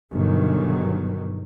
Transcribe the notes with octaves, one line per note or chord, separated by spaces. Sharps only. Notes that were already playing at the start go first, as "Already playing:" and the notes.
G1 G2 B2 D3 D#3 F#3